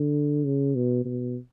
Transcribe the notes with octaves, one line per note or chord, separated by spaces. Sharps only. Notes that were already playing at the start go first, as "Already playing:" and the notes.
Already playing: D3
C#3
B2
B2